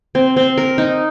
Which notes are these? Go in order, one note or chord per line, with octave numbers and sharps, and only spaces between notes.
C4
C4
A#4
D#4